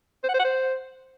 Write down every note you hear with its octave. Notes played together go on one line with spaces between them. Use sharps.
C5
F#5
C5
F#5
C5